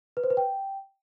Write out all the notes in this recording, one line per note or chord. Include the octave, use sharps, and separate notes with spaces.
B4
C5
B4
G5